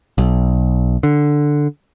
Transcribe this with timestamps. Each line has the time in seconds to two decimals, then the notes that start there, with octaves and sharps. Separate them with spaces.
0.18 B1
1.03 D3